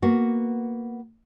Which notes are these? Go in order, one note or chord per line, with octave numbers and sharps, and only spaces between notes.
A#3 B3 F#4